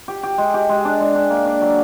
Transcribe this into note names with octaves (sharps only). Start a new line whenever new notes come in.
G4
G4
G#3
G4
G#3
D4
G#3
D4
A#3
D4
F#3